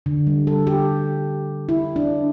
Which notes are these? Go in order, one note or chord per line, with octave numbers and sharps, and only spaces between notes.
D3
G3
A4
G4
E4
D4